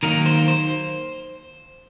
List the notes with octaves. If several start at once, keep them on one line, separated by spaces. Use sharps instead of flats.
D#3 F#3 A#3 A#4
C5
C5